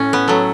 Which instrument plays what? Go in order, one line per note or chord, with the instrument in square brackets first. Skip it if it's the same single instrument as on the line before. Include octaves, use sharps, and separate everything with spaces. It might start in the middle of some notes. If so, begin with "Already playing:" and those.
Already playing: [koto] A2 C#4
B3
F#3 A3